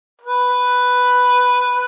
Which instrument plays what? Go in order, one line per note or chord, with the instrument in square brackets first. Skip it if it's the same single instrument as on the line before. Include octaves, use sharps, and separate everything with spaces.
[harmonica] B4